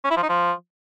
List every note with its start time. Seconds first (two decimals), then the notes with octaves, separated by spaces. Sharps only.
0.04 C#4
0.11 E4
0.17 F3
0.23 D#4
0.29 F3